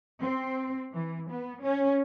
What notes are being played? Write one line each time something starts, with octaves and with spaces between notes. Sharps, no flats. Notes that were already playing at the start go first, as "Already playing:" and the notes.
C4
E3
B3
C#4